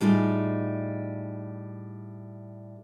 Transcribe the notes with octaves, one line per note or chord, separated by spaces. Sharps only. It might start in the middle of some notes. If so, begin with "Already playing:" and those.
A2 G3 D#4 F4 G#4